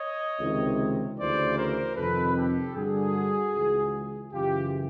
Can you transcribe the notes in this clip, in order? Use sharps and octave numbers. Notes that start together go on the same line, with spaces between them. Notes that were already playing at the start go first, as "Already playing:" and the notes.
Already playing: C#5 D#5
C#2 C3 D#3
D2 C#3 E3 C5 D5
A#4 C5
F2 C3 D#3 A4 B4
G4 A4
G2 D3 F#4 G#4
C#2 C#3 E3
F#2 C#3 E3 F4 G4